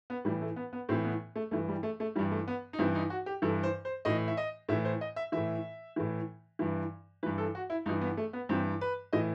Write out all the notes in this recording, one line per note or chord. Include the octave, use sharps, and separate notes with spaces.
B3
A2 E3 G3
A3
B3
B3
A2 E3 C4
B3
A3
G2 E3 A3
G3
A3
A3
G2 E3 G3
A3
B3
D#4
G2 E3 C4
D#4
F#4
G4
G2 E3 A4
C5
C5
A2 E3 D#5
E5
D#5
A2 E3 E5
C5
D#5
E5
A2 E3 E5
A2 E3
G2 E3
G2 E3 B4
A4
F#4
E4
G2 E3 D#4
B3
A3
B3
G2 E3 C4
B4
A2 E3 D#5